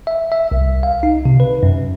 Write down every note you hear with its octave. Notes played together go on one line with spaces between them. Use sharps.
E5
E5
C2
F5
D#4
C3
B4
F#2